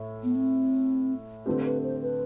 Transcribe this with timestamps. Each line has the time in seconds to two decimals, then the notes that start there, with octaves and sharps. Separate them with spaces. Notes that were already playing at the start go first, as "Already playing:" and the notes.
Already playing: A2
0.23 B3
0.35 C4
1.46 D3 A3 C4 G4 B4
1.65 B4
1.83 C5
2.02 B4